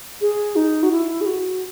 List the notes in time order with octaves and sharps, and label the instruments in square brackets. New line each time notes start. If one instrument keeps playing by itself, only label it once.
[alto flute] G#4
D#4
F#4
E4
G#4
F#4